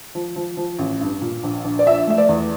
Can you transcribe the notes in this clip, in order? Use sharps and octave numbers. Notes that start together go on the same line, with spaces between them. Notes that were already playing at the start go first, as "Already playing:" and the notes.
F3
F3
F3
A1
G2
A#2
A#1
A#1
D5
F3 E5
A3 E5
D5
E2